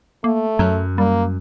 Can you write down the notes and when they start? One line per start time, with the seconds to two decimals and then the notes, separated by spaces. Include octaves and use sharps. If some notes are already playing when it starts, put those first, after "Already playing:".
0.24 A3 A#3
0.59 F#2 F#3
0.98 G3 A#3